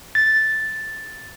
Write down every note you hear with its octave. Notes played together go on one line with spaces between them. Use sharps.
A6